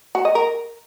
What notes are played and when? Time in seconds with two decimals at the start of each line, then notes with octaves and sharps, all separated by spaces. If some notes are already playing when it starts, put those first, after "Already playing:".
0.15 F#4
0.25 D#5
0.35 A#4